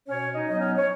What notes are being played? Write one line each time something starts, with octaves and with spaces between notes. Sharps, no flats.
B2 C#4 C#5
D#4 D#5
F#3 B3 D#4 D#5
C#4 C#5
C#5